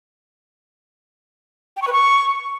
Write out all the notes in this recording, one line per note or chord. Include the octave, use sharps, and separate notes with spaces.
G5
C#6
B4
C#6